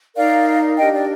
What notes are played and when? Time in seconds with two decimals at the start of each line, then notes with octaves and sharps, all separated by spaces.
0.16 D#4 A#4 D5 F5
0.77 D4 G4 A#4 D#5 G5
0.94 D5